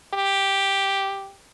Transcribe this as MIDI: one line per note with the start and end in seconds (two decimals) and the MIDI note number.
0.14 1.35 67